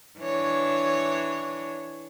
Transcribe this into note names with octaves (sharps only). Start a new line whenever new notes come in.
E3 D4 C#5